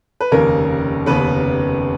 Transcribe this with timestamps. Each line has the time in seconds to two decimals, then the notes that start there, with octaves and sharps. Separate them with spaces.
0.21 B4
0.31 F1 D#2 C#3 A#3 A#4
1.06 F1 D#2 C#3 B3 B4